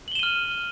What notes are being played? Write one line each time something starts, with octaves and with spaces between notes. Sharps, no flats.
F6 D#7 E7 F#7 G7